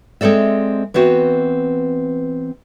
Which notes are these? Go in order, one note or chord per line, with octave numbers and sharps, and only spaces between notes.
G#3 C4 A4 D5 E5
E3 B3 C4 F#4